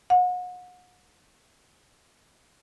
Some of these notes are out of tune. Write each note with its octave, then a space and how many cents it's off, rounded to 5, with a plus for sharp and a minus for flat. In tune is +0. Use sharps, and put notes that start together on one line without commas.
F#5 -35